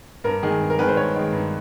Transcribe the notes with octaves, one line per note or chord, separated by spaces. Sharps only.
G2 A#4
D#3 G#3 G#4
G2
A#4
D#3 G#3 B4
C5
G2 C#5
D#3 G#3
G2